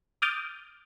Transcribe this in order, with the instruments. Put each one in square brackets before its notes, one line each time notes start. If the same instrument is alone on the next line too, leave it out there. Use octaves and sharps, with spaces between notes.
[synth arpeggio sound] D6 D#6 F6 G6 A6